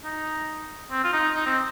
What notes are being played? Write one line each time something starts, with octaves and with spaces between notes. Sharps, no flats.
D#4
C4
F4
D#4
D#4
C4